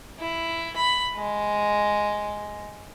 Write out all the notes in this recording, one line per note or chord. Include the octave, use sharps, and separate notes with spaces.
E4
B5
G#3